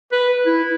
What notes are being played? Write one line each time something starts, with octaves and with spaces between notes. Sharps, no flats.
B4
E4